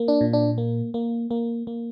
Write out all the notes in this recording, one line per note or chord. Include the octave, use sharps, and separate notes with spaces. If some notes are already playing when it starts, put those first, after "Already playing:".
Already playing: A#3
D4
A#2
D4
A#3
A#3
A#3
A#3